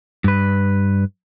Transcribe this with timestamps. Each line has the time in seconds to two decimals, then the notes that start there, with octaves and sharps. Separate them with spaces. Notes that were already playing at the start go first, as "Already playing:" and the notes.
0.24 G2 B4